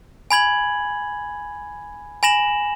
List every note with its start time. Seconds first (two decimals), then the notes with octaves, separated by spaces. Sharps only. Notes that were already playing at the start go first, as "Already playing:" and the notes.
0.31 G#5 B5 G#6 F#7
2.23 G#5 B5 A#6 E7 F#7